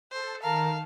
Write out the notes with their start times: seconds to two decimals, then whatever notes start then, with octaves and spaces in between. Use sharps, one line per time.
0.12 A4 C5
0.43 D#3 A#4 F5 A5